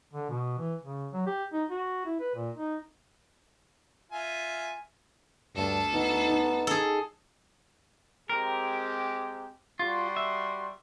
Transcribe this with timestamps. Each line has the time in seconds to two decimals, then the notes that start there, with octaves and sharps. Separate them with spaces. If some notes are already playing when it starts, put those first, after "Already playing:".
0.14 D3
0.30 B2
0.58 E3
0.81 C#3
1.14 F#3
1.27 G4
1.53 D#4
1.71 F#4
2.06 E4
2.21 B4
2.36 A#2
2.55 D#4
4.12 F4 E5 G#5
5.55 D2 G2 A4 A5
5.94 B3 D#4
6.30 D#4
6.67 G#4 A4
8.30 G#3 C4 G4 A#4
9.79 G3 F4 F#4 C6
10.16 E5